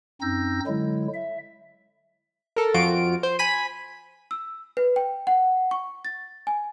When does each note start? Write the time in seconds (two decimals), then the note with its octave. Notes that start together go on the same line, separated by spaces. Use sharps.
0.21 F#2 C4 D#4 E6 G6 A#6
0.67 D3 F#3 G#3 E4
1.14 E5
2.56 A4 A#4
2.74 F2 F4 F#4 D7
3.23 C5
3.39 G#5 B5 B6 D#7
4.31 E6
4.77 B4
4.96 G5
5.27 F#5
5.71 C#6
6.05 A6
6.47 G#5